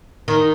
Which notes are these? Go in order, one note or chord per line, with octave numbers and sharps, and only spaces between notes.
D#3